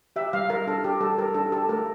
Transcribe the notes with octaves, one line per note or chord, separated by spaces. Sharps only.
G4 E5
G3 F5
G3 A#4
D4 A4
G4
G3 A4
G3 A#4
D4 A4
G4 A4
A3 A#4